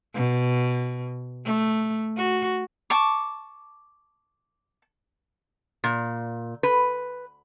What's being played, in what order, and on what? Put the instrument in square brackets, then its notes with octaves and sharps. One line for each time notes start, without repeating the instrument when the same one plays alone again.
[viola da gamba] B2
A3
F#4
[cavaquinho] A5 C#6 D6
[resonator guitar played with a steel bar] A#2
B4